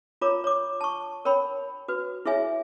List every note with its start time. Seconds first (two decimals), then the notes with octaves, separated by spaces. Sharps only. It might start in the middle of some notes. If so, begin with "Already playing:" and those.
0.21 F4 A#4 C#5 A#5 D6
0.44 C#5 D6
0.81 A5 C#6
1.25 A#4 C#5 G5 B5
1.88 F#4 B4
2.26 E4 G#4 C#5 E5 G#5